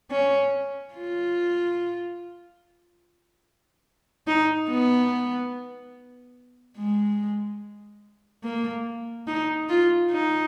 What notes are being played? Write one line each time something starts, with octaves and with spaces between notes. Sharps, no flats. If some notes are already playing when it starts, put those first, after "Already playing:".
C#4
F4
D#4
B3
G#3
A#3
D#4
F4
D#4